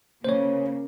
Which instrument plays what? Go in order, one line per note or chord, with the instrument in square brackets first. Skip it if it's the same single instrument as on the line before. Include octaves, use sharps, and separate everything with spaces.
[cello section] C#3 A#3 [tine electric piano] C5 C#5